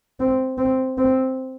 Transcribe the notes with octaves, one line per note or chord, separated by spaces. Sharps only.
C4
C4
C4